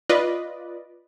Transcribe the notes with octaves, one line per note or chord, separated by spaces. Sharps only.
F4 B4 D5 D#5